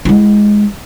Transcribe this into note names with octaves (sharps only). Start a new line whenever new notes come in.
G#3 E4